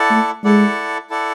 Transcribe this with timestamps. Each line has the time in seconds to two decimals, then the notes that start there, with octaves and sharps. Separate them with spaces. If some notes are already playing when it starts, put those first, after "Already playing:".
Already playing: E4 A4 D5 F#5 A5
0.11 A3
0.44 G#3 E4 A4 D5 F#5 A5
1.10 E4 A4 D5 F#5 A5